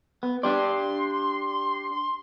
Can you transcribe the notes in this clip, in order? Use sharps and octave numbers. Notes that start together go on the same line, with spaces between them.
B3
D4 G4 D5 C6